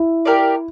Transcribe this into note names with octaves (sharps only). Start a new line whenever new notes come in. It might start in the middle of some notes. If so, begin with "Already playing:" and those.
Already playing: E4
G4 A#4 D5